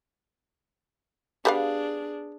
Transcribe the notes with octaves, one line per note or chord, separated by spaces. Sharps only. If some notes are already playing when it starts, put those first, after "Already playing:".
G3 B3 D4 G#4 F5